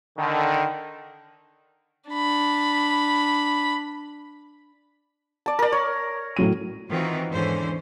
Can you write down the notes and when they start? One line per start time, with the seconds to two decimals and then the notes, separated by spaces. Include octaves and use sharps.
0.18 D3 D#3
2.10 D4 B5
5.46 D5 A5
5.59 A#4 D5
5.72 C#5
6.36 A2 F#3 D#7
6.89 D#3 E3 C4 F4 F#4
7.31 E2 G#2 D3 E3 C#4 C5